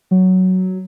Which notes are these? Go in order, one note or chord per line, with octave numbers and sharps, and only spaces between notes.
F#3